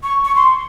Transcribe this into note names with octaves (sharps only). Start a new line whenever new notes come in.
C#6
C#6
C6